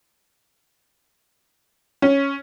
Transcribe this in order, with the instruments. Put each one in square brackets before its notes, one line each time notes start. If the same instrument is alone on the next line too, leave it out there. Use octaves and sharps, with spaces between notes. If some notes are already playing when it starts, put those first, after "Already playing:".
[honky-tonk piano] C#4